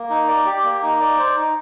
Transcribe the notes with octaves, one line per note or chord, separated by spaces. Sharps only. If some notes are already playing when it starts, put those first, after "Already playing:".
Already playing: A#3
D#4
D5
G4
A#3
D#4
D5
C5
D#4